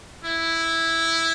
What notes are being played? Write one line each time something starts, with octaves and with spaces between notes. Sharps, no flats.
E4